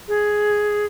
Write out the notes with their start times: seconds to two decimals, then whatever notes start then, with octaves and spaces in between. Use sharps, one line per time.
0.08 G#4